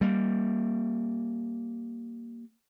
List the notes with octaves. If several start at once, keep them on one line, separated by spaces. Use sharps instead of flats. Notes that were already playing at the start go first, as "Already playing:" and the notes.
G3 A#3